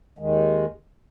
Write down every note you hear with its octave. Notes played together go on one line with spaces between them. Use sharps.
D#2 D#3 G#3